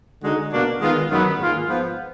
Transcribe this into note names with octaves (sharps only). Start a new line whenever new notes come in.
D3 G#3 D#4 F#4
B2 A#3 D4 F#4
D#3 G#3 B3 F4
F#2 D#3 F#3 B3
G#2 D#3 A#3 F4 G#4
G#2 F3 B3